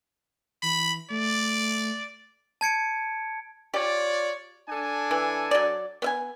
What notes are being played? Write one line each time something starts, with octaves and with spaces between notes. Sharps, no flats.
E3 B5
A3 D5
A5 G#6 C#7 D7
F4 G4 C#5 D5
D4 A4 G#5
E3
F#3 D5
B3 E5 G#5